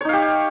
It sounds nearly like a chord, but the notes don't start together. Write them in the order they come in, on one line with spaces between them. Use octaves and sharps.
C#5 D#4 F5 G4